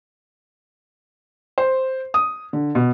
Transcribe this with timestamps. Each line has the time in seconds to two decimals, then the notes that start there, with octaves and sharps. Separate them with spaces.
1.58 C5
2.14 D#6
2.53 D3
2.75 B2